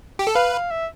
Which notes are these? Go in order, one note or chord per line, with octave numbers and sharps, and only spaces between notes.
G4
A4
B4 F5
F5
E5